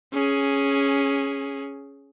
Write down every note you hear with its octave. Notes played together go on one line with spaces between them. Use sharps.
C#4 G#4